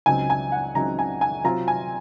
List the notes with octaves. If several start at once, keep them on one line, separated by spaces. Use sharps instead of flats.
C#2 C#3 F#3 C4 D#4 G#5
G#5
F#5
C#2 C#3 F#3 C4 D#4 A#5
G#5
G#5
C3 F#3 C4 F4 A#5
G#5